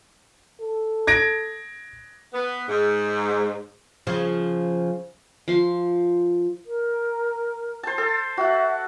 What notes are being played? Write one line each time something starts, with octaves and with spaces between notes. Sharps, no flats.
A4
G#6 A#6 D7
B3
G#2
C#3 F3
F3 C6
A#4
C5 A5
A4
F#4 E5 F#5